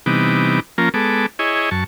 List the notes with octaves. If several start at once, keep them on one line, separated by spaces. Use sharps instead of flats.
C3 E3 G3 B3 D#4 D6
F3 A#3 C#4 F4 A#4
G#3 B3 A4 D6
E4 G#4 C#5 D#5
F#2 A5 C#6